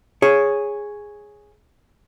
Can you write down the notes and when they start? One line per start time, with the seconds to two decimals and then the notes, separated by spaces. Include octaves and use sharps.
0.22 G#4 C#5